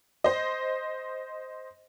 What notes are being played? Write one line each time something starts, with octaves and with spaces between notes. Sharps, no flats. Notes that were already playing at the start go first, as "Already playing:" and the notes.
C5 D#5